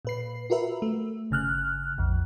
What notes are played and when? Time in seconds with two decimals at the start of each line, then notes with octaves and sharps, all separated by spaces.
0.05 A#2 B4 C7
0.50 F4 F#4 A#4 B4 E5
0.82 A3
1.31 G1 C#3 F6 F#6
1.98 A#1 F2